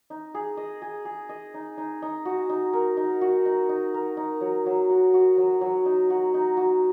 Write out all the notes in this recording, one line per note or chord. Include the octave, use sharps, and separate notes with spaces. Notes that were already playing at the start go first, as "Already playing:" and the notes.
D#4
G#4
D#5
G#4
G#4
D#5
D#4
D#4
D#4
F#4
D#4
A#4
D#4
F#4
D#4
D#4
A#4
D#4
F#3
F#3
F#4
F#4
F#3
F#3
D#4
F#4
D#4
F#4